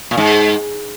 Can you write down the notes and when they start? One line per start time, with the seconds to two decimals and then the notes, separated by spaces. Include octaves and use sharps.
0.11 A#2
0.17 G#2